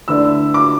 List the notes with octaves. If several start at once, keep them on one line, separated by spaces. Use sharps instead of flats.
D3 A3 E4 B4 D5 E6
D6